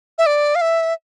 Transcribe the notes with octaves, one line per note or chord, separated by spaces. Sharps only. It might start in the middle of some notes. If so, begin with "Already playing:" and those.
E5
D5
F5
E5